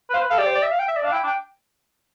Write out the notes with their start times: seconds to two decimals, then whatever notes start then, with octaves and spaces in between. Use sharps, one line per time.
0.10 B4
0.14 C5 F5
0.22 B4
0.30 A4 F5
0.38 G4 D5
0.47 C5
0.55 D5
0.63 E5
0.71 F5
0.79 G5
0.88 E5
0.96 D5
1.03 D4 F5
1.12 E4 G5
1.24 D4
1.27 G5